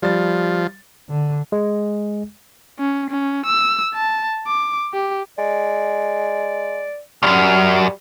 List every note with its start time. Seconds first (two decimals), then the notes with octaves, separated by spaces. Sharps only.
0.02 F3 G3 A6
1.09 D3
1.52 G#3
2.79 C#4
3.10 C#4
3.45 E6
3.94 A5
4.47 D6
4.94 G4
5.38 G#3 D5
7.23 C#2 F#2 G3 F6